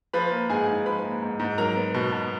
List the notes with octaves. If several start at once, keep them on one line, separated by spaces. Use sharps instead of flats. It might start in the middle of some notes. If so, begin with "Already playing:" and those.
F3 B4 B5
A#3
G#2 G#4 G#5
G#2
F3 B4 B5
A#3
G#2
G#2
F#3 A#4 A#5
B3
B2
B2